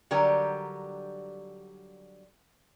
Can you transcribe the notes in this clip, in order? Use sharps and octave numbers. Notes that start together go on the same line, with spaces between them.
D3 F#3 G3 G4 A#4